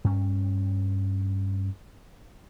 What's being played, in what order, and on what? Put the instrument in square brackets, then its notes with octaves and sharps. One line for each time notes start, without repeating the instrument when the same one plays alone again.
[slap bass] G2 C#4